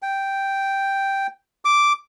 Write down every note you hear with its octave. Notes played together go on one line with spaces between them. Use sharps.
G5
D6